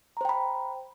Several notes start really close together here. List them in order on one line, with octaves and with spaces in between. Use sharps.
A#5 C5 G5 B5